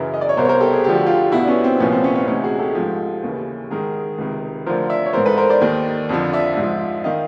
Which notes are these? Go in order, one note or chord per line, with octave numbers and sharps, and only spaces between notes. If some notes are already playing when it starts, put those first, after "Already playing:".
Already playing: F#2 C#3 E3 A#4
D#5
D5
C#5
C2 B2 A#4 C5
C#5
A#4 C5
G4 A4
G#4
D2 D3 F3 G4
F#4
F4 G4
E2 B2 E4 F#4
D4
B3 C#4
C4
C2 A#2 F3 B3 C#4
C4
B3 C#4
B3 C#4
D2 C3 E3 C#4 D#4
F#4 G#4
G4 A4
G#2 F3
D#2 C#3 E3
G#2 D#3 G#4 A#4
C#2 C3 D#3
D2 D3 F3 A#4 C5
D5 E5
C#5
G#2 E3 A#4 C5
A4 B4
A#4 C5
C5 D5
D#2 D#3
F2 D3 F3
D5 E5
G#2
F3
D#3 D#5 F5